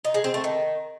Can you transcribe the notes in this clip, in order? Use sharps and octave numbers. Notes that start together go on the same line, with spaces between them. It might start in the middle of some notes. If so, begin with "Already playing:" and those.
D#4
G#3
C4
A3
D#3